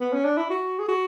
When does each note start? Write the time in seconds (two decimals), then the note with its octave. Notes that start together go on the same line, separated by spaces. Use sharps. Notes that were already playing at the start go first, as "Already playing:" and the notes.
0.01 B3
0.13 C#4
0.25 D4
0.37 E4
0.50 F#4
0.79 G#4
0.88 F#4